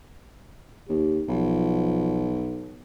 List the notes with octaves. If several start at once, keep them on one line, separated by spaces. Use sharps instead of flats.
D#2 G4
B1 F3